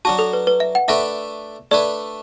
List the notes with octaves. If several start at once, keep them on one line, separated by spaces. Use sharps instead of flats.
F#3 D4 F#4 A5
A4
B4
B4
E5
F#5
A3 D4 B4 D5 E5
A3 D4 B4 D5